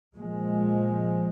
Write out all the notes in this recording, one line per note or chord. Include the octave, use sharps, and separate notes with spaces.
A#2 F3 G#3